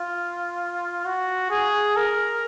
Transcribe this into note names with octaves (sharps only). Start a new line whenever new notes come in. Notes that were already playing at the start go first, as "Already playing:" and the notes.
Already playing: F4
F#4
G#4
A#4